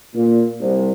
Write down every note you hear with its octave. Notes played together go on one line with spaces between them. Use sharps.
A#2
C2